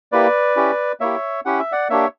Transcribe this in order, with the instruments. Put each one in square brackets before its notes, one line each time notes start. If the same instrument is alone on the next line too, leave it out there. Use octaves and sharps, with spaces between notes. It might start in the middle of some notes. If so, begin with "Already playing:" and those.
[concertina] A#3 E4 G4 B4 D5
C#4 E4 G4
A#3 E4 G4 C#5 E5
C#4 E4 G4 F#5
E5
D5 F#5
A#3 D4 G4 C#5 E5